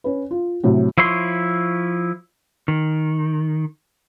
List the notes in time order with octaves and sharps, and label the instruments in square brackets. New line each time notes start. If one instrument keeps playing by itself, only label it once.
[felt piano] C#4 B4
F4
A2 C3 F#3
[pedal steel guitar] F3 E4 C#5 C6
[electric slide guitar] D#3